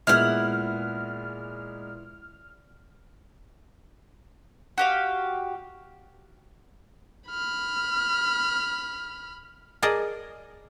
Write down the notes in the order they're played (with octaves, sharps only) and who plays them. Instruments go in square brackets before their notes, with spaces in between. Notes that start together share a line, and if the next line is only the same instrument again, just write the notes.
[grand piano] A#2 G#3 B3 [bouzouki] E4 F#5 [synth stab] F6
[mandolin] F#4 G4 F5
[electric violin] B5 F6
[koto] G#4 A#4 D5 D#5 A5